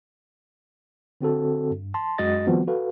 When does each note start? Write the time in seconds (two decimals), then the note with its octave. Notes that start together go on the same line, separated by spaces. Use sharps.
1.21 D3 C4 F#4 A4
1.71 G2
1.94 A5 C6
2.18 F#2 G#3 F#4 D#5 A6 A#6
2.47 D#3 F3 G3 B3 C4 F#4
2.68 F#4 A4 B4 F5